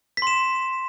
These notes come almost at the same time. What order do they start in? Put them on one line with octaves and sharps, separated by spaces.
B6 C6 E7